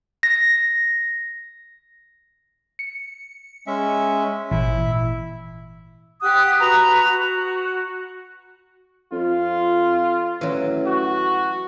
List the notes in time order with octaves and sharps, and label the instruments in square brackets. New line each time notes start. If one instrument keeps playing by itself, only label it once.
[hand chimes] A#6
[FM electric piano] C#7
[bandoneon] G#3 C#4 E5
[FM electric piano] G#1 A#2 E3 [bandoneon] E4 E5
[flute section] G4 F#5 D#6 F#6
F#4 B4 A#5
F#4
[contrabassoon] F2 [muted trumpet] F4
[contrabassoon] A1 [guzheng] E3 F#3
[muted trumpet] F#4